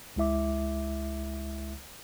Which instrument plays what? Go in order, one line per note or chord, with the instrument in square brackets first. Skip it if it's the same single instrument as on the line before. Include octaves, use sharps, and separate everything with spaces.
[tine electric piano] C#2 G#3 E4 E5 D6